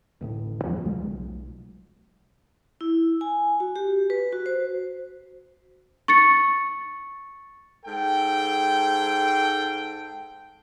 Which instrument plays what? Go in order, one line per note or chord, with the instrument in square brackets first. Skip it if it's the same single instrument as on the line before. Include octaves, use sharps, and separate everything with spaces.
[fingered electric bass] D1 A1 A2
E2 G#2 F3 F#3
C#2 F#3 G#3 A3
B1
[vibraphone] E4
G#5
F#4
G4
B4
F#4
C5
[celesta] C#6 A6 C#7
[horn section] G#2 A4 G5